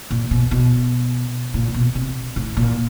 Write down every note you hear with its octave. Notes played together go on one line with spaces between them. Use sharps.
A#2
B2
B2
A#2
B2
C3
A2
A#2